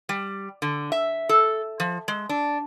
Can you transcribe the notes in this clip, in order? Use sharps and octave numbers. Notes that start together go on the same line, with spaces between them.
G3
D3
E5
A4
F3
G#3
D4